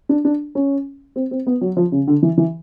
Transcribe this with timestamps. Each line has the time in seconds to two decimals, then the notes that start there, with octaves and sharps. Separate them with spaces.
0.09 D4
0.25 D4
0.55 C#4
1.16 C4
1.31 C4
1.47 B3
1.61 F#3
1.77 F3
1.92 C#3
2.07 D3
2.23 E3
2.37 E3